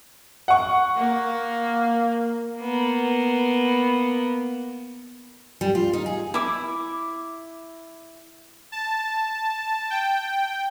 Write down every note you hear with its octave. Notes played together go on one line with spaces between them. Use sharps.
F#5 C#6
A#3
A#3 B3
G3
F4
D#4
G#4
E4 D6
A5
G5